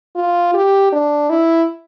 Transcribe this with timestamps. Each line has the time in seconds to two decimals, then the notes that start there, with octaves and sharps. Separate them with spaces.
0.16 F4
0.54 G4
0.92 D4
1.30 E4